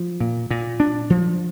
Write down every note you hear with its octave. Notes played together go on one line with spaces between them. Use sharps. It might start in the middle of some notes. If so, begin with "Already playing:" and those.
Already playing: F3
A#2
A#2
D4
F3